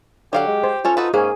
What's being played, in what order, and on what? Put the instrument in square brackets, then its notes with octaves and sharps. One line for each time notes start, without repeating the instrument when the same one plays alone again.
[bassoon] D3 [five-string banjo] F#3 F5 F#5 [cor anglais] G4
[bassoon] G#3
[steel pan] C5
[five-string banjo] C#4 A4 C#5 [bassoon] F4
[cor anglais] D#4 [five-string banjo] F#4 A4 B4
[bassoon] G#2 [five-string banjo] A#3 [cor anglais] C#4 [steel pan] G#4 G#5